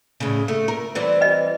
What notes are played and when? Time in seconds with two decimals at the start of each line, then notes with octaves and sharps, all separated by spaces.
0.20 A2 C#3
0.48 A3
0.68 A#4
0.95 E3 G3 C4
1.21 B4 D#5